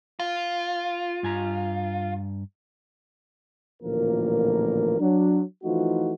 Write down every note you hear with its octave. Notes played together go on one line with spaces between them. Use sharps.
F4
G2 G#5 A#5
A1 D2 A#2 F3 A#3 A#4
F#3 D4
E3 F3 A3 D#4 F4 F#4